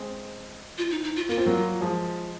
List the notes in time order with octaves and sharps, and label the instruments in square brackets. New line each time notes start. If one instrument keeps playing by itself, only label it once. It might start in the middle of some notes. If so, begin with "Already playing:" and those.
Already playing: [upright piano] G#3 C4
[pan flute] F4
D#4
D#4
F4
[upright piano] A#3 [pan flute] F4
[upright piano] C4
F#3 A#3
F3 G#3